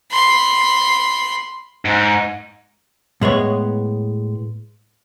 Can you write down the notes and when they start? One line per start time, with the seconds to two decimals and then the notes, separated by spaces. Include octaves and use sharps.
0.11 B5 C6
1.85 G#2
3.21 A2 G#3 B3 C#5